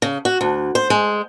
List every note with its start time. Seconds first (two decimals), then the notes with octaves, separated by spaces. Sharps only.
0.02 C#3
0.25 F#4
0.41 D2
0.75 C5
0.90 G#3